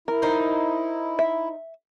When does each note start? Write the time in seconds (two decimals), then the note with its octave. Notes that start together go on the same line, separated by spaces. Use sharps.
0.08 E4 A#4
0.22 D#4 C5
1.19 E5